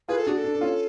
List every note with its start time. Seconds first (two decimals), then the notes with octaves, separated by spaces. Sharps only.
0.08 F4 G#4 B4
0.18 A4
0.27 D4 F#4 G#4
0.37 A4
0.44 D4
0.55 D4
0.61 C#4 F4